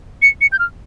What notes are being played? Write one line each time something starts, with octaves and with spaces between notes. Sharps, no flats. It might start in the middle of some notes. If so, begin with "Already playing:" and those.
C#7
C#7
G6
F6